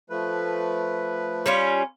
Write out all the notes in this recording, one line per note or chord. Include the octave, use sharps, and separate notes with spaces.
F3 A3 B4
G3 C#4 F4